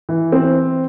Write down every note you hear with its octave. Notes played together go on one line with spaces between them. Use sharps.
E3
C4